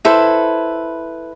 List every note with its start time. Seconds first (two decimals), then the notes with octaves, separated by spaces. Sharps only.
0.05 E4 A4 B4 C5